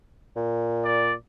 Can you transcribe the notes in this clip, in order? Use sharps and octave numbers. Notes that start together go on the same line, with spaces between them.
A#2
D5